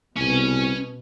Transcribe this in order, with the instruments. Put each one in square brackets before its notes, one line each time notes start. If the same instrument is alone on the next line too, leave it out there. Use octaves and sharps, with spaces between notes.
[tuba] C2 [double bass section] B2 [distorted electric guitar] C#4 G#5